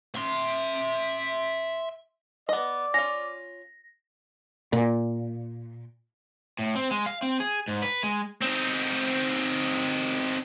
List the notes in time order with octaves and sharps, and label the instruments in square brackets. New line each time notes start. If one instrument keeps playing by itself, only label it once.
[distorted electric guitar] E5 C6
[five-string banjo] B3 D#5 [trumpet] D5
[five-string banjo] C#4 F4 [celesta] A#6
[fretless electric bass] A#2
[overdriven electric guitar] A2
C4
G#3
F5
C4
G#4
G#2
B4
G#3
[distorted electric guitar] C4 D#4